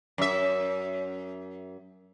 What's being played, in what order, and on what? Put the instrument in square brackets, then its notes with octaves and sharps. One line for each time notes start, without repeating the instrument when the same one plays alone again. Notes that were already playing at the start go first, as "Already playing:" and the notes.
[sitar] F#2 E5